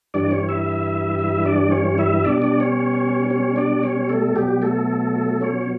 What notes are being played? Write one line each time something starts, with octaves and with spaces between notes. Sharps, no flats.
G2 E3 G3 D4 D5
C#4 C#5
E4 E5
E4 E5
D4 D5
C#4 C#5
E4 E5
B2 G3 D4 D5
D4 D5
C#4 C#5
C#4 C#5
D4 D5
C#4 C#5
A3 A4
B2 F#3 G3 G4
A3 A4
C#4 C#5